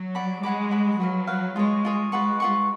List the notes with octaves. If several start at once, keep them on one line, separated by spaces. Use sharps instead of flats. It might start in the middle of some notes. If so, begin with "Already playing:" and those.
Already playing: F#3
D5 F#5 B5
G#3 C#5 F#5 B5 D6
C#5 F#5 B5 D6
F#3 F#4 B4 F5
F#4 B4 F5
G#3 F4 G#4 C#5
F4 G#4 C#5
G#3 F4 B4 F#5 C#6
F4 B4 F#5 C#6